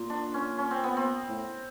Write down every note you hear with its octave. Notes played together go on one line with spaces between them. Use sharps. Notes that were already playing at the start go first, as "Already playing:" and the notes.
Already playing: A#2
D4
C#4
C#4
C4
B3
C4
A2